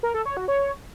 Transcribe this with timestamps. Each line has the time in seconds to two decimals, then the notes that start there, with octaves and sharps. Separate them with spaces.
0.03 A#4
0.14 A4
0.26 C#5
0.37 F#4
0.48 C#5